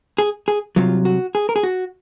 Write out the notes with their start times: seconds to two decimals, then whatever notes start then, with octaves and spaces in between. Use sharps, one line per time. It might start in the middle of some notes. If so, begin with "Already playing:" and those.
0.18 G#4
0.48 G#4
0.76 C2 C3 F#3 F4
1.05 F#4
1.35 G#4
1.49 A#4
1.56 G#4
1.63 F#4